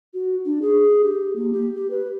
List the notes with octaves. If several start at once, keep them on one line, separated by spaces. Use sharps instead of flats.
F#4
D4
G#4
G4
A#3
G4
G4
B4